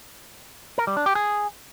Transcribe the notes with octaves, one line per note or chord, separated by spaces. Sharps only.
A#4
G3
D4
G4
G#4